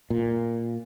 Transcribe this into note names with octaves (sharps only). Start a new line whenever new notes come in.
A#2